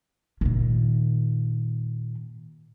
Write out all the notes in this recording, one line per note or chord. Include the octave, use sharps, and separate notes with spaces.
A#2 D#3